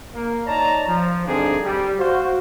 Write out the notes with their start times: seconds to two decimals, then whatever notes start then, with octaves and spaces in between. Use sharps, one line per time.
0.15 A#3
0.47 D#4 C#5 D5 A5 A#5
0.87 F3
1.26 G2 D3 C4 D4 D#4 G#4
1.63 G3
1.98 F#4 C5 F5